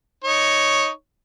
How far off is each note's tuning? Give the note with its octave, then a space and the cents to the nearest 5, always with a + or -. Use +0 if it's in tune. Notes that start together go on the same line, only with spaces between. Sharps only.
D#4 +0 C#5 +0